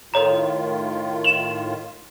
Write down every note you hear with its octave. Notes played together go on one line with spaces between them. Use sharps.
A2 D#3 F4 A4 C#5 A#5
E7